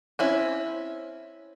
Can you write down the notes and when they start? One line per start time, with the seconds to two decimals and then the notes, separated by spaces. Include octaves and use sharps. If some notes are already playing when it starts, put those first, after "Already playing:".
0.19 C4 C#4 E4